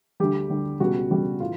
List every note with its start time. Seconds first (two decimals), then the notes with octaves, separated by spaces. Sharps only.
0.20 D2 D3 G3 G4
0.50 D2 D3 G3
0.80 C#2 B2 G3 F#4
1.10 C#2 B2 G3
1.40 A2 E3 F4